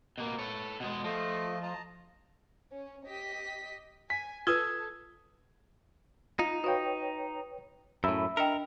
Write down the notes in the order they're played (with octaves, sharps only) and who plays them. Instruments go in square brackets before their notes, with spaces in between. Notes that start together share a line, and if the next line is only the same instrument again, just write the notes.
[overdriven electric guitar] B2 A#3
[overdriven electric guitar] A4 C#5 [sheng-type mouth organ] B4
[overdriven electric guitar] B2 G#3
[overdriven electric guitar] F3 [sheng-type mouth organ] A3 D#5
[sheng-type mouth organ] D#5 A5 A#5
[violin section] C#4
G4 D#5 B6
[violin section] G#5 [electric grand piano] B6
[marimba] F4 B4 [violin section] A4 [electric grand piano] D#6 E6 G#6
[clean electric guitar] D#4 [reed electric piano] F4
[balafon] F#4 F5 [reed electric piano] B4 C#5 G5
[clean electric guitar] F#2 A2 [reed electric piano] E5 B5 E6
[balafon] D4 D#5 G5 [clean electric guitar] A#4